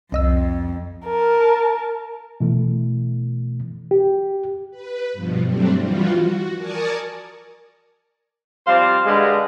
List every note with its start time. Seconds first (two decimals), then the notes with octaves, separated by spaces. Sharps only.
0.12 C2 F2 D#5 E6
1.06 A#4 A5
2.40 B2 E3 A3
3.91 G4
4.71 B4
5.13 G2 B2 F3
5.45 F#3 G3 A3 C4 D4
5.76 E3 F3 G3 F4 F#4
6.18 F#4
6.56 A#4 D5 G#5 A5 C#6 D#6
8.67 F3 G3 C4 C5 D5 F5
9.05 G2 D3 G3 G#3